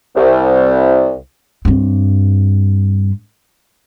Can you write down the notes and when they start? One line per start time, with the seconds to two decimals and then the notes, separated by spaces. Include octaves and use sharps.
0.16 C2
1.65 G2 C4